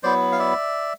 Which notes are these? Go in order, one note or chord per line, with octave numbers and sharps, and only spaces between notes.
F#3 B3 E4 C5 D5
F5
D5 E5